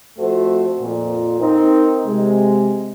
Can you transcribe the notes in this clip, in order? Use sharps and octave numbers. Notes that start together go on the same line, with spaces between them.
F2 A3 F#4 C5
F2 A#2
C4 D#4 A#4
C3 G#3